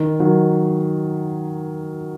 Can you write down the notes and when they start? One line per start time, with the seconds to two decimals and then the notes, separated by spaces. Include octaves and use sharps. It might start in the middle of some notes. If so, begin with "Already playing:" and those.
Already playing: D#3
0.20 D#3 F#3